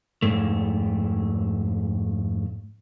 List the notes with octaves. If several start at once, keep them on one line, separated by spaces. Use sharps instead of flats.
F2 G#2 A3